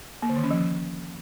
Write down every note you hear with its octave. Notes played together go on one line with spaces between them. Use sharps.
A#3
D3
D#3
C#4
F3